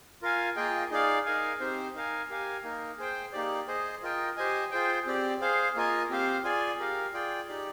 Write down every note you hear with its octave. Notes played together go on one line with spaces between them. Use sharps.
F4 A#4 F5 G#5
A#3 F4 G#4 D#5 G5
D#4 G#4 D5 F5
D#4 A#4 F5 G#5
C4 D#4 G4 C5
D#4 A#4 F5 G#5
G4 A#4 F5 G#5
A#3 D#4 A#4
G#4 C5 G5
A#3 D#4 G4 D5
G#4 C5 D#5
F4 A#4 D#5 G5
G4 C5 D#5 G#5
F4 G#4 C5 G5
C4 G4 D5
G#4 C5 F5
A#3 F4 A#4 D#5 G#5
C4 G4 C5 F5
F4 G#4 D5 G#5
G4 A#4 F5
F4 G#4 D5 G5
D#4 G4 D5